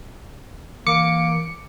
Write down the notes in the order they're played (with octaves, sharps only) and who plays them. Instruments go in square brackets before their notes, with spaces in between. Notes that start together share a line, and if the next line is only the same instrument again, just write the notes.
[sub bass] E3 [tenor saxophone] A#3 [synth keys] D6 [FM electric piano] C#7